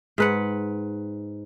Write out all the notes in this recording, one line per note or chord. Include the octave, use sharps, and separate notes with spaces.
G#2 B4 F#5